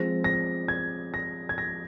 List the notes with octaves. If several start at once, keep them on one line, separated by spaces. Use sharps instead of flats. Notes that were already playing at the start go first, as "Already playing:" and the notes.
Already playing: F3 G#3 C4 A#6
A#6
G#6
A#6
G#6
A#6